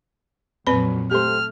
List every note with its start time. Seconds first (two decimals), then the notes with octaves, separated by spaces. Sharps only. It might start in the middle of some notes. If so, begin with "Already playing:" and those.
0.67 F2 A#2 F#3 C4 B4 D5 B5
1.11 A3 G4 A4 C5 F6